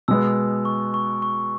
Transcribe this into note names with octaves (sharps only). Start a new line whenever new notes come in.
B2 G#3 B3 E6
C#6
C#6
C#6